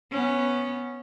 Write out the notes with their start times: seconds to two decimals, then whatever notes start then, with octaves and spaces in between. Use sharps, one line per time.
0.12 B3 C#4